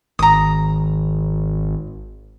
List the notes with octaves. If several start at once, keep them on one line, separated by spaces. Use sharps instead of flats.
G#1 A#5 D#6